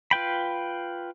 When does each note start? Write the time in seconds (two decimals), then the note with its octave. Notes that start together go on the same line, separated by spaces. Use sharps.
0.11 F4 B4 G5 B5